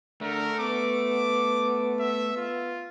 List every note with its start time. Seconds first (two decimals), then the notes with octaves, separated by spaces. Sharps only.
0.21 D3 A3 A#4
0.60 B3 D6
2.00 E5
2.37 F4